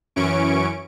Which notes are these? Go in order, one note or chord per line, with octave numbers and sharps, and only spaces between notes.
F#2 E3 C#4 C#6 D7